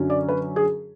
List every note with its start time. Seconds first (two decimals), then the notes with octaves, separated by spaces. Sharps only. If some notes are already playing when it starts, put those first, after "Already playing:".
Already playing: F#2 D3 F#3 C#4
0.10 D5
0.28 B4
0.56 G#4